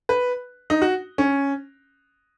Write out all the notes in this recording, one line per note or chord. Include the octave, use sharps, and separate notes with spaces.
B4
D#4
F#4
C#4